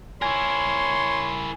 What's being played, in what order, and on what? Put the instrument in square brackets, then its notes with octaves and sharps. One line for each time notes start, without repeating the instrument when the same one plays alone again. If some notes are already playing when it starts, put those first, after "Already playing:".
[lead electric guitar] E4 A#4 [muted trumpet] C#5 [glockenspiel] G#5 G#6 [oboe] C6